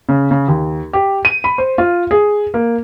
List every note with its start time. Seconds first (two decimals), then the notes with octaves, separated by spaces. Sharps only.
0.09 C#3
0.31 C#3
0.48 D#2
0.93 G4
1.25 D#7
1.44 B5
1.58 C5
1.78 F4
2.11 G#4
2.54 A#3